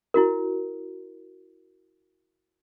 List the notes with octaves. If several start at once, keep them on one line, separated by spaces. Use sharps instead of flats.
E4 F#4 A#4